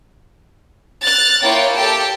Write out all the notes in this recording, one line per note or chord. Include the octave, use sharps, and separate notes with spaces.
F6 F#6 A6
A#3 E4 F4 C#5 G5
G4 A4 G5 A5